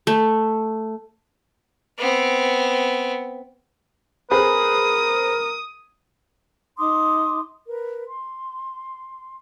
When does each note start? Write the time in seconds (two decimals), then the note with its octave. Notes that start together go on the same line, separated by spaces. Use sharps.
0.07 A3
1.99 B3 C4
4.31 C4 G#4 A#4 B4 B5 D#6
6.78 D#4 C6 D6 D#6
7.69 A#4 B4
8.07 C6